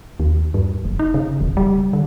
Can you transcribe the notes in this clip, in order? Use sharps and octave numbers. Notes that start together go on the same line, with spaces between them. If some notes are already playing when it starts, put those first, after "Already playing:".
D#2
G2
F#1
D#4
C#3
E1
G3
D3